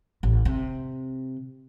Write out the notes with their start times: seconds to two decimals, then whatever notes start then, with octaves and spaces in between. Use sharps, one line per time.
0.23 A1
0.45 C3